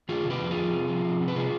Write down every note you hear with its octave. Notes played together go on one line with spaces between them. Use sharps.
D#3 F4 G#4
C3
G4 B4
F2
F4 G#4
F2
C3
F3
C3
C3
B4
C3 F4 G#4